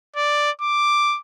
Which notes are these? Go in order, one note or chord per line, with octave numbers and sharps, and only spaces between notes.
D5
D6